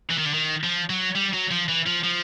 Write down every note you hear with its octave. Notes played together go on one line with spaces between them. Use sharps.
E3
D#3
D3
D#3
F3
F#3
G3
F#3
F3
E3
F3
F3